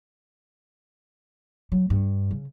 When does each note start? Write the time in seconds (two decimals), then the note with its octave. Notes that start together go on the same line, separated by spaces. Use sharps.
1.72 F#3
1.90 G2
2.31 C#3